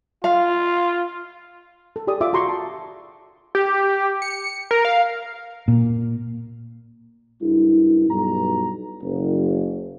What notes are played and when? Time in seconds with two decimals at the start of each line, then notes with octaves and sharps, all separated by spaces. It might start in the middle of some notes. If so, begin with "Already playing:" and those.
0.24 F4 F5
1.96 A4
2.07 G4 G#4 D5 D#6
2.21 F4 E5 D6
2.33 F#4 A#5 C6 C#6
2.49 A5
3.55 G4
4.22 C#7
4.71 A#4
4.85 F5
5.68 A#2
7.41 F#1 G2 D4 E4
8.08 B1 G2 A#5
9.02 F#1